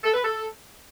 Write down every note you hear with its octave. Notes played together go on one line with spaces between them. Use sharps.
A4
B4
A4